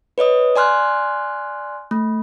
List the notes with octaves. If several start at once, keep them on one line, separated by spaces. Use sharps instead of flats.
B4 C#5 D#5 D#6
D5 G#5 C6 F6 F#6
A3